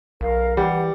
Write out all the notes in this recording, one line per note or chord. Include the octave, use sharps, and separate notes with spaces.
B1 A#4 F5
E3 G3 F#5